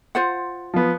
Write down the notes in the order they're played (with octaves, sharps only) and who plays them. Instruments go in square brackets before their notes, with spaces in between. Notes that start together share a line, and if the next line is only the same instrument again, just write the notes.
[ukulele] F4 C5 F#5
[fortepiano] F3 B3